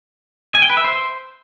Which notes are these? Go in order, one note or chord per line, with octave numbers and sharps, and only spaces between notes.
G#5
G5
B4
E5
C5